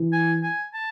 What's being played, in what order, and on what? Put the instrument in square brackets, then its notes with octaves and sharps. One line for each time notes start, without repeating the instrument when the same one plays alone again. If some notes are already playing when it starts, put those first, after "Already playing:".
Already playing: [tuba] E3
[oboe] G#5
G#5
A5